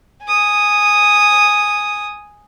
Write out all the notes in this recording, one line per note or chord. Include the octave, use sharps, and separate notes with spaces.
G#5 D#6